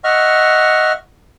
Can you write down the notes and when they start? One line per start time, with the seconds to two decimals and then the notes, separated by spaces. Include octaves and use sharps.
0.04 D#5 E5 F#5 C#6 F6